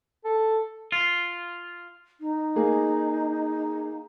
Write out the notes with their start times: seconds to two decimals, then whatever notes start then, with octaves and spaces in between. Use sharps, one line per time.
0.25 A4
0.92 F4
2.20 D#4
2.56 A#3 G#4